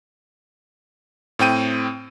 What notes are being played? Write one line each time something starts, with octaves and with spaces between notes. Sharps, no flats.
A2 C4 G5 D#7